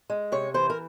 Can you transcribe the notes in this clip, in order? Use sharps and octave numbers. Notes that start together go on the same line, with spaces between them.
G#3
C3 C#5
E3 C5
A#4